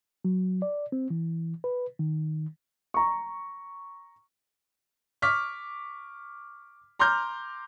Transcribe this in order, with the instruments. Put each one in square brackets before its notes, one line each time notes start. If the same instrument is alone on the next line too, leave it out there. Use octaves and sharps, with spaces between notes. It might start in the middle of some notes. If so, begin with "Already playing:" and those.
[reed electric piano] F#3
D5
C4
E3
B4
D#3
[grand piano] A#5 C#6
[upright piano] C#6 D6 F6 B6
A#5 C6 D6 F6 G6